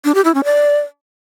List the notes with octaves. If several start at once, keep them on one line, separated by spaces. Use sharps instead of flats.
D4
G4
E4
C#4
D5